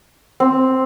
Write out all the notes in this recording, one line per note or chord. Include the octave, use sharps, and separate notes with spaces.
C4